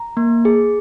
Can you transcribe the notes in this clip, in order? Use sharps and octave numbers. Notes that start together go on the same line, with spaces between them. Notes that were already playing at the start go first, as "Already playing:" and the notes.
Already playing: A#5
A#3
G#4